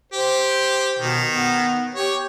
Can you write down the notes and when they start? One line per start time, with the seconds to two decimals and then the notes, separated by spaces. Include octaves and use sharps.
0.13 G4 C5
0.99 B2 D#3
1.27 B3
1.94 G4 C#5